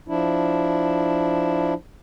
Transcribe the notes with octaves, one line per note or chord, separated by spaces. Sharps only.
F3 D4 E4